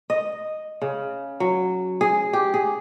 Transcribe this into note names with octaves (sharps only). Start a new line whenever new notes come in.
D#5
C#3
F#3
G#4
G4
G#4